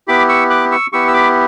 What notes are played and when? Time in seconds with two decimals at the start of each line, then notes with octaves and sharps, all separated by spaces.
0.07 B3 E4 G4 B5 D6
0.29 C#6 E6
0.50 D6 F#6
0.72 C#6 E6
0.92 B3 E4 G4 C#6 E6
1.08 E6
1.14 B5 D6